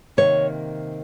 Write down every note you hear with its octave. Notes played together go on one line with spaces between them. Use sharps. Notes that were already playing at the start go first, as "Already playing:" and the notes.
C3 D#3 A#3 C#5